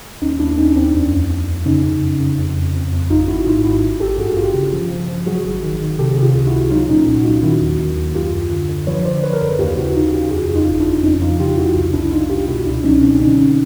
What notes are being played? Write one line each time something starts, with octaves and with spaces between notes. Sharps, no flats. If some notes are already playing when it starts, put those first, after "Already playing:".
D#2 C#4 D#4
D#2 D4 E4
D#2 C#4 D#4
D#2 C4 D4
F2
F2
F2
F2
C#3 C#4 D#4
F#2
F#2
C#3
F2
F2
F2
F2
G#1 D#4 F4
G#1 E4 F#4
G#2 D#4 F4
G#1 E4 F#4
A1
A1 G4 A4
G2 F#4 G#4
G2 F4 G4
C#3
F3
F3
F3
F#3 F#4 G#4
G#1
D#3
D#3
C3 G4 A4
C3 G#4
F4 G4
C#2
E4 F#4
C#2
F#3 D#4 F4
A#2 C#4 D#4
C2
F#4
F#3 D#4 F4
D#3 E4 F#4
D#2
D#3
D#2
F#2 F4 G4
F#2
D3
D3
F3 B4 C#5
D3 C5 D5
F3 B4 C#5
A#4
F#2 A4 B4
D#2 F4 G4
C#3 E4 F#4
C#3 D#4 F4
D#2 F4 G4
G4
F2 F#4 G#4
C#3
D#4 F4
G1
D4 E4
G1
F2 C#4 D#4
F3 D#4 F4
C#3 F4 G4
F2 E4 F#4
C2
C2 D4 E4
C2 D#4 F4
C2 F4 G4
B2 E4 F#4
C#2 D4 E4
F#3 C#4 D#4
B2 C4 D4
D3 C#4 D#4
D3